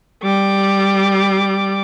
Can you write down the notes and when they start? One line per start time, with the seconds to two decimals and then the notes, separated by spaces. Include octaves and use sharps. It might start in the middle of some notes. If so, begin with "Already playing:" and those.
0.24 G3 D6